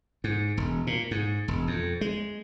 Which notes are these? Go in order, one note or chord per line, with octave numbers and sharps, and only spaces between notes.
G#2
E1
A#2
G#2
E1
F2
G#3